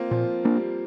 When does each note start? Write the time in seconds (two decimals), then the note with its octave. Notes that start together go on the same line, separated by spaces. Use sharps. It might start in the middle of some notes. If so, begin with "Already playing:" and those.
Already playing: A#3 C4 F4
0.11 A#2 F3
0.45 A#3 D4
0.56 G3